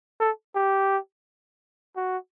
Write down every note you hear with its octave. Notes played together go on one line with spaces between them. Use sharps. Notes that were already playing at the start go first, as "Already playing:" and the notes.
A4
G4
F#4